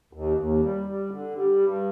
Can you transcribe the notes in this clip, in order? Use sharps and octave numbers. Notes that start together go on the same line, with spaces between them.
D#2
D#2
G3
G3
D3
G3
G2